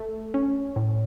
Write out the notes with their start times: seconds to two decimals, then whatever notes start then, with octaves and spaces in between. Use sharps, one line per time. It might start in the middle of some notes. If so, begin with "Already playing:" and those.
Already playing: A3
0.34 C#4
0.76 A2